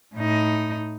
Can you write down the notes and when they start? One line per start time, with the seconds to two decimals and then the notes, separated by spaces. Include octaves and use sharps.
0.15 A2 D#4